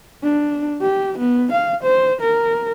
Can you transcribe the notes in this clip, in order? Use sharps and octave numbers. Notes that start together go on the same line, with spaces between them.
D4
G4
B3
F5
C5
A#4